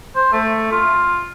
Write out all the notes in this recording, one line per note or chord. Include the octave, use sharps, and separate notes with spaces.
C5
A3
F4